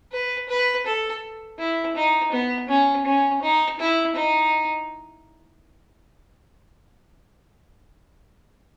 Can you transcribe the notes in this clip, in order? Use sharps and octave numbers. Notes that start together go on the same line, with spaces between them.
B4
B4
A4
E4
D#4
B3
C#4
C#4
D#4
E4
D#4